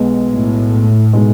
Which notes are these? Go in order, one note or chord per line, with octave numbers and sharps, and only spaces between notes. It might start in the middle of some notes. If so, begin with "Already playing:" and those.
Already playing: B1 B2 G#3 B3
A2
B2 G#3 D#4